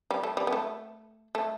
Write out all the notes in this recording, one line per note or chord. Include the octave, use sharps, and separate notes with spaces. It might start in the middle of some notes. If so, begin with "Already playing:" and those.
G3
A3
G3
B3
A3
A3